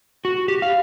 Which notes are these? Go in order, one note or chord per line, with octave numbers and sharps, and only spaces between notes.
F#4
G4
F5